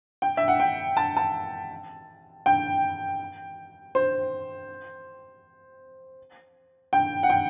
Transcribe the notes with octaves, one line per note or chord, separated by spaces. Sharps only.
G5
E5
F#5
G5
A5
A5
G5
C5
G5
F#5
G5